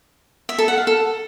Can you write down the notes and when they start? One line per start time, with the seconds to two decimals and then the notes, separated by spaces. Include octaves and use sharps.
0.49 E5
0.58 A4
0.68 F#5
0.78 F5
0.87 A4